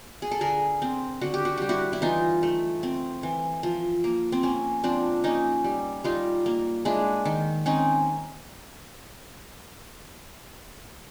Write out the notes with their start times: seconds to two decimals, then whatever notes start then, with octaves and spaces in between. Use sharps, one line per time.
0.22 G#4
0.31 A4
0.41 D3 G#4 A#4
0.82 C4
1.21 D3 F#4
1.34 G4
1.45 F#4
1.57 G3 G4
1.69 E4 F#4
1.93 E4
2.02 E3 D#4 F4
2.43 A3
2.83 C4
3.23 E3
3.63 F3
4.04 A#3
4.32 C4
4.43 A#3 C#4
4.84 F3 C4 D4
5.24 A#3 C#4 D#4
5.64 G3
6.04 G3 D#4 F4
6.46 A#3
6.85 G#3 D4 E4
7.25 D#3
7.66 C4 C#4 D#4